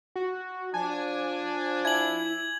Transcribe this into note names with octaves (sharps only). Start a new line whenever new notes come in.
F#4
F3 D4 G#5 A5
E4 G#5 G#6 F#7